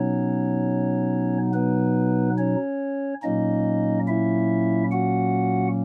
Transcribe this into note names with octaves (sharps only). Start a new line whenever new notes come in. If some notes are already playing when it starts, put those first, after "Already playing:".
Already playing: B2 F#3 B3 C#4 D#4 C#5
B3 B4
C#4 C#5
A#2 F#3 A#3 C#4 D#4 D#5
E4 E5
F#4 F#5